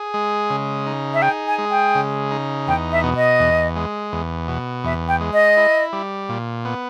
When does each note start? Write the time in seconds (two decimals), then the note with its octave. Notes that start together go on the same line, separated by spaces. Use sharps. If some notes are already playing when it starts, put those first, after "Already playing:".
Already playing: G#4
0.14 G#3
0.50 C#3
0.86 D#4
1.14 E5
1.22 G#4 G5
1.47 G#5
1.58 G#3
1.71 G5
1.95 C#3
2.31 D#4
2.67 E2 G5
2.92 E5
3.04 B2
3.16 D#5
3.40 E2
3.76 G#3
4.12 E2
4.48 B2
4.84 E2 E5
5.08 G5
5.20 G#3
5.33 D#5
5.57 E4
5.93 G3
6.29 A#2
6.65 B3